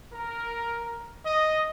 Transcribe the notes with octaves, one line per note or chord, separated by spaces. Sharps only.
A#4
D#5